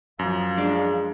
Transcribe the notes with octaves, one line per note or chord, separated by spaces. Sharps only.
F#2 F3 F5
G#3 D4